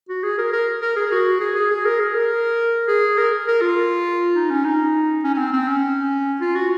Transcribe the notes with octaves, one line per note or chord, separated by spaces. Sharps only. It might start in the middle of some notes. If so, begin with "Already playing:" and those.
F#4
G#4
A#4
A#4
A#4
G#4
F#4
G#4
G#4
G#4
A#4
G#4
A#4
G#4
A#4
A#4
F4
D#4
C#4
D#4
C#4
C#4
C4
C4
C#4
F4
F#4